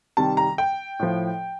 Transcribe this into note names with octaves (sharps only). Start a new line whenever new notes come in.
C3 D#3 G3 A5
A#5
G5
A2 F3